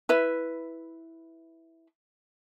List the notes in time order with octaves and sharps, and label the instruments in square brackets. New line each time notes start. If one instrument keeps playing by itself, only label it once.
[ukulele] E4 B4 E5